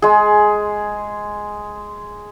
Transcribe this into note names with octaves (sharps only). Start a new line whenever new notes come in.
G#3 G#4